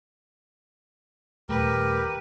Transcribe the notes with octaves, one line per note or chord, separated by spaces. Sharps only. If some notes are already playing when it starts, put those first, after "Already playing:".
D#1 A3 G4 A#4 B4